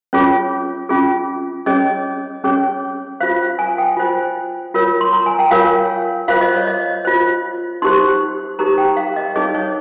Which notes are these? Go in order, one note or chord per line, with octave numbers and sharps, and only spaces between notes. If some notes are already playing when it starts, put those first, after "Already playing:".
C#4 F4 G#4 C#5
C#4 F4 G#4
C#4 G#4 C#5 D#5
C#4 G#4 C#5
F4 C5 F5
G#5
G5
F4 C5
F4 A#4 C#5
C6
A#5
G#5
G5
F4 A#4 C#5 F5
F4 C5 F5
D#5
C#5
D#5
F4 C5
D#4 G4 C5 C6
D#4 G4 C5 A#5
G5
F5
D#5
D#4 G#4 C#5 D#5
C#5